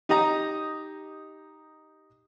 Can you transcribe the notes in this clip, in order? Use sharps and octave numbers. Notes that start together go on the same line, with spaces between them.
D#4 G4 D#5 A#5